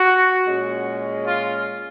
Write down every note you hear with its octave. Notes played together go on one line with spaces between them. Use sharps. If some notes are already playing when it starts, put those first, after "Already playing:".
Already playing: F#4
A#2 G#3 C#4
F4